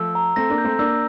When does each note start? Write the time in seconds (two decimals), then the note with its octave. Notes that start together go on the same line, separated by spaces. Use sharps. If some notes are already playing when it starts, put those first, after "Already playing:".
Already playing: F3 A3 E6
0.15 A#5
0.36 A3 C4 A#6
0.50 A#3 D4
0.58 G6
0.65 A3 C4
0.79 A#3 D4 E6